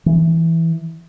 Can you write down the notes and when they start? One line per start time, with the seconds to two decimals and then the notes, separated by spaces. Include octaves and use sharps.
0.06 E3